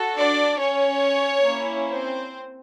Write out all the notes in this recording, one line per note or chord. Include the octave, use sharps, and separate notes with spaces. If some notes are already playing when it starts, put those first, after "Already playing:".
Already playing: F#4 A4
D4 D5
C#4 C#5
A#3 C#4 E4
C4 C5